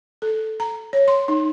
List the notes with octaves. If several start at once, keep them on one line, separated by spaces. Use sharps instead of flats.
A4
A#5
C#5
C6
D#4